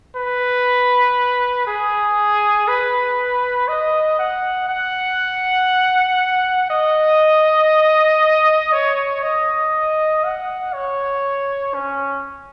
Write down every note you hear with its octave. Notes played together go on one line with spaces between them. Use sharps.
B4
G#4
B4
D#5
F#5
F#5
D#5
C#5
D#5
F#5
C#5
C#4